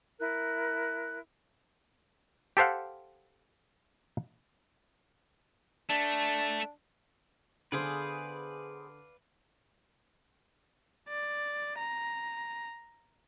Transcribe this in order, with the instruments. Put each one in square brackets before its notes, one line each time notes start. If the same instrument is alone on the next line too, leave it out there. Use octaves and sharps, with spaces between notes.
[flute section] E4 A#4 F#6
[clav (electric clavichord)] G4 A4 C5 F5 F#5
[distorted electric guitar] A3 [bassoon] D4
[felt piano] D3 [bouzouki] B3 G#4 C5 [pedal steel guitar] B4 D5 F5
[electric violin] D5
A#5